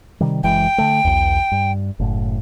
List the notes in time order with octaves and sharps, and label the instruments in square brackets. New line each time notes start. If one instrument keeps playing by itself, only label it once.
[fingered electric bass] C3 D#3 G3
[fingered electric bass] F#1 E3 G#3 [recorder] G5
[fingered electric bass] D3 A3
B1 E2
G2
F#1 A2